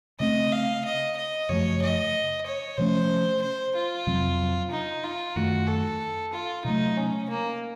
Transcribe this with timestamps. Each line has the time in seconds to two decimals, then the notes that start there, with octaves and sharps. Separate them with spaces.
0.20 C#3 A3 C4 D#5
0.52 F5
0.85 D#5
1.17 D#5
1.49 F#2 C#3 F3 A3 C#5
1.82 D#5
2.46 C#5
2.77 C3 F3 A3 C#4 C5
3.42 C5
3.75 F4
4.07 F2 C3 F#3 C4
4.71 D#4
5.04 F4
5.36 F#2 D#3 A3 F#4
5.68 A4
6.33 F4
6.65 C3 F#3 A3 D#4
6.97 C#4
7.30 A#3